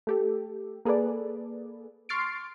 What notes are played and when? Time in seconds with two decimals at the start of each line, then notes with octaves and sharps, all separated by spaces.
0.07 A3 G4 A4
0.85 A#3 G#4 A4 B4 D5
2.09 C6 C#6 F6 A6 C7 D7